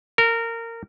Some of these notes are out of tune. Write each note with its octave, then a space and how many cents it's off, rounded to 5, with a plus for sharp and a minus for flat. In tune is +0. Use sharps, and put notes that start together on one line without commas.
A#4 -20